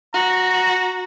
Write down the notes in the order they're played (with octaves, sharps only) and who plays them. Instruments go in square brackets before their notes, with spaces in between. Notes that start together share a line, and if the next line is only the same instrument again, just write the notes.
[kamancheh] F#4 [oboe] A#5